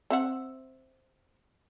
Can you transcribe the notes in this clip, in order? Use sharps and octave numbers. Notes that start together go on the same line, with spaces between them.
C4 E5 F#5